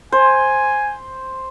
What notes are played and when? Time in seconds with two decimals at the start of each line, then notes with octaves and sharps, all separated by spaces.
0.12 C5 G#5